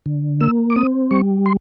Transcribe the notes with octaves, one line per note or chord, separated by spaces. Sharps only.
D3
A#3 E6
D6
C4 D#6
G3 C#6
C6